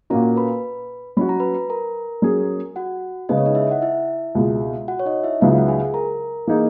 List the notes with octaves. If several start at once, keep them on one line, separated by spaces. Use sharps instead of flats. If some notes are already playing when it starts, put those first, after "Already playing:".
A#2 A#3 C#4 F#4 A#4 A#5
B4 B5
F#3 C#4 F#4 B5
A#5
B4 B5
A#4 A#5
F#3 C#4 G#4
F#4 F#5
C#3 G#3 B3 D#5
C#5
D#4 D#5
E4 E5
F#5
E4 E5
C#2 B2 G#3
F#4 F#5
C#5
D#4 D#5
E4 E5
C#2 C#3 F#3 B3 D#4 E4 E5
F#5
G#4 G#5
A#4 A#5
E3 A#3 D#4 G#4